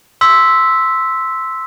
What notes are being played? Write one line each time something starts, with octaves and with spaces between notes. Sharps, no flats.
C6 E6 B6